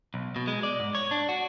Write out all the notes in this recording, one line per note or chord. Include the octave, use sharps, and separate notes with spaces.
B1
B2
G#3
D5
G#2
C#5
D4
F#4